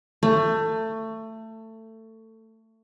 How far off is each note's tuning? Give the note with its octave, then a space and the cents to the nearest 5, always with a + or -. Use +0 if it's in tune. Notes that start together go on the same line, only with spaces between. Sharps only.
A3 +20